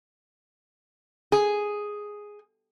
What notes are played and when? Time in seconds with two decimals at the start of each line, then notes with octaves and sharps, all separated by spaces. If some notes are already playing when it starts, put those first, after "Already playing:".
1.32 G#4